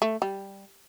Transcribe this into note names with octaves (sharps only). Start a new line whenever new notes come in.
A3
G3